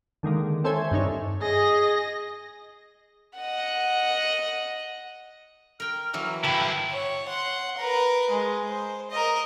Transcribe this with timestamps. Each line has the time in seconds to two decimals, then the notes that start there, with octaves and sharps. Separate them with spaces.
0.23 D3 D#3 G#3 A#3
0.64 C4 A4 C5 C#5 E5 G#5
0.91 G2 D4 D#4 C#5
1.42 G#4 D#5 A#6
3.38 D#5 F#5
5.80 A#4 G5 F6
6.13 E3 F#3 A#3 E6
6.44 G2 D3 E4 B4 G5
6.91 C#5
7.29 F#5 C6
7.77 A#4 B4
8.30 G#3
8.69 C5
9.11 A#4 D#5